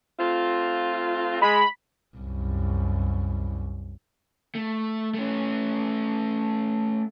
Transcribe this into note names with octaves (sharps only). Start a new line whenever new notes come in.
A3 C4 F4
G#3 B5
C2 F#2
A3
A3 C#4